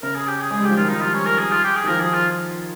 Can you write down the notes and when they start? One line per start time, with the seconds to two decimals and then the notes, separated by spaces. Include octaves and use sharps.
0.02 C#3 A#4
0.15 G#4
0.27 G4
0.40 G#4
0.51 G#3 G#4
0.59 G3
0.64 F3 G4
0.76 D#3 F4
0.89 F3 D#4
1.01 G3 F4
1.14 C#4
1.26 A#4
1.39 G#4
1.51 F4
1.64 G4
1.76 G#4
1.84 D#3
1.88 F3 A#4
2.01 G#4
2.13 F4